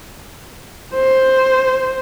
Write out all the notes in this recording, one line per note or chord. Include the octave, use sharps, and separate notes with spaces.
C5